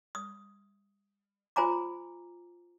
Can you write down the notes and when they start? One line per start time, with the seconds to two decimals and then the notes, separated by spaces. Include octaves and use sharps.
0.15 D#6
1.56 F4 C5 G#5 A#5 D6